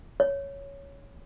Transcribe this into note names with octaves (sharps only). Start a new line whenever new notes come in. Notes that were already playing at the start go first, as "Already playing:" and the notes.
C#5